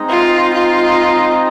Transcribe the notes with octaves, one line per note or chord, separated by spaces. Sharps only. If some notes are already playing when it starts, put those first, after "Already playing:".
Already playing: G#3 C4 D#4
F4
F4